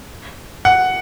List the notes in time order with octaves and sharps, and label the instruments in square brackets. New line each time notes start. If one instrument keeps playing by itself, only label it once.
[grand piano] F#5